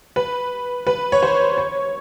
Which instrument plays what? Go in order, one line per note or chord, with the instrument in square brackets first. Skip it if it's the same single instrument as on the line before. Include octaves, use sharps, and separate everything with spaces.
[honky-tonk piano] B4
B4
C#5
C5
C#5